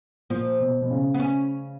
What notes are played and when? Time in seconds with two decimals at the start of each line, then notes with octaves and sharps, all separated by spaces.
0.30 A#2 F3
0.60 B2
0.81 B2
0.90 C#3
1.14 B3
1.20 C#4